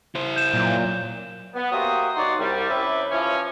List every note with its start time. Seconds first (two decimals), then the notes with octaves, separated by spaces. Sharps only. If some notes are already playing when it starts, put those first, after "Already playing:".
0.15 E4 C5
0.36 G6 E7
0.54 A#2 F#3
1.55 B3
1.72 A#3 F#4 G4 C5 E5 D#6
2.16 D#4 F#4 C#5 D5 F#5 C6
2.38 C2 G3
2.69 C3 C#4 E4 G4 B4 E5
3.11 E3 F3 C#4